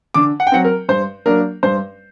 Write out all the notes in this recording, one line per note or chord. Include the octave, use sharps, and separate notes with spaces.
D3 D6
F#5
G5
F#3 C4 F#5
A#4
G2 C5
F#3 A#3 D4 A#4
G2 C5